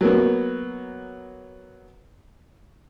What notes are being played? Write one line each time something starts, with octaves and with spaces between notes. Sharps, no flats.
F#3 A#3 B3